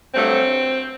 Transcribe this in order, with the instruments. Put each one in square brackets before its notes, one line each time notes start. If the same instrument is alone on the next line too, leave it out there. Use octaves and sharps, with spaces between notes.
[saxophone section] G2 F#3 A3 C4